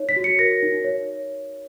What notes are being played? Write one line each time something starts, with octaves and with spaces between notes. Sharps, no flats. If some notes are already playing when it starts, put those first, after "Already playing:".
Already playing: D#4 C#5
B6
F#4
C#7
A#4 A#6
D#4
C#5